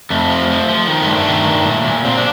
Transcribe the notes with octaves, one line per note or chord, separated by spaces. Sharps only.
F2 A3
F3
F3
F3
D#3
A3
G2
A3
D#3
G2
A#2
A#2
A#2 C4
D4